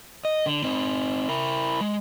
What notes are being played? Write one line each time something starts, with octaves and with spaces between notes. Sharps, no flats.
D#5
D3
C4 D#4
E4 A#4
G#3